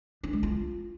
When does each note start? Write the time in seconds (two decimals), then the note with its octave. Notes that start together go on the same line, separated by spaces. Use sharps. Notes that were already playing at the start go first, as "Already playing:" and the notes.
0.23 D4
0.33 G#3
0.43 F4